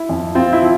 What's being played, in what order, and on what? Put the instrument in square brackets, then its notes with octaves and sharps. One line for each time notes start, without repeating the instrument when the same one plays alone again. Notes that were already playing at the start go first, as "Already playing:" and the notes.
Already playing: [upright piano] E4
[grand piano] F2
[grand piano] C4 [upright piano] F4
[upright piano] E4
[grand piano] F3